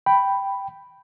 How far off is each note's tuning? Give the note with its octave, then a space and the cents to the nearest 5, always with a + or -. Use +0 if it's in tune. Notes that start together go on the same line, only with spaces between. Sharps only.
G5 +0 B5 +0